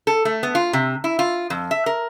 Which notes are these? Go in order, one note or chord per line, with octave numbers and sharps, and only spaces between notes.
A4
A3
B3
F4
C3
E4
F4
F2
E5
A#4